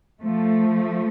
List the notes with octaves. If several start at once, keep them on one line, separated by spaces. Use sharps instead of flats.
F3 A3